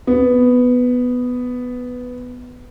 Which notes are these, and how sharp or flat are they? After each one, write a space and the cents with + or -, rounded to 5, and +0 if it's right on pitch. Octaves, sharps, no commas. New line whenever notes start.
B3 +5